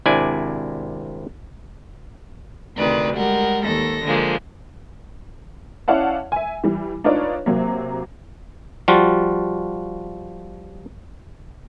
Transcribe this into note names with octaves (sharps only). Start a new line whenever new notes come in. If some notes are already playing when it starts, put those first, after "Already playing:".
G#1 C3 D4 E4 D5 G#5
D2 C3 D#3 B4 D5
G3 G#3 A#4 F#5
D#2 A4 A#6
D3 F3 G#3 A#3
C#4 E4 D5 F5 F#5 A5
E5 G#5
E3 G3
D4 D#4 F4 B4 C#5 D5
C3 F#3 A#3
F3 G3 F4 F#4